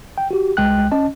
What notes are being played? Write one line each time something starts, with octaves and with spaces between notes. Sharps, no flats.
G5
F#4 G4
C2 G#3 G5 F#6
C#4 D#5 A5